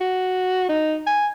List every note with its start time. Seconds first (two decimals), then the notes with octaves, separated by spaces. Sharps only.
0.01 F#4
0.69 D#4
1.07 G#5